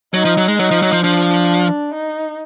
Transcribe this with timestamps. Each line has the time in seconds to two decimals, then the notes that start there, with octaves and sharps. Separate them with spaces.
0.14 F#3 D#4
0.25 F3
0.37 F#3
0.48 G#3
0.59 F#3 D#4
0.71 F3
0.82 F#3
0.92 F3
1.04 F3 D4
1.94 D#4